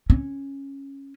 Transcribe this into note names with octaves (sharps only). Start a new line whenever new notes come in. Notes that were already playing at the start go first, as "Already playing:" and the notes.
C#4